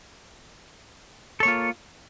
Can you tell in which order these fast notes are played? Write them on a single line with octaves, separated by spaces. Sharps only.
A4 C#5 A#3 F4